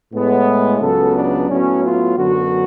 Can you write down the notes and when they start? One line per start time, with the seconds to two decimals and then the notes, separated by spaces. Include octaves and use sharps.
0.13 A2 G#3 B3
0.81 C#2 C#3 F#3 B3 A4
1.16 D4
1.49 A2 F#3 B3 C#4
1.83 F4
2.17 F#2 D3 F#3 B3 F#4